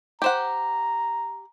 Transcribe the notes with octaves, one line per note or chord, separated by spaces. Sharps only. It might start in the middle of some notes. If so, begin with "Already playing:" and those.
G4 C5 F#5 A#5